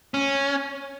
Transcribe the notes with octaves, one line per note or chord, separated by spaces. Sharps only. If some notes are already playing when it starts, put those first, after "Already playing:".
C#4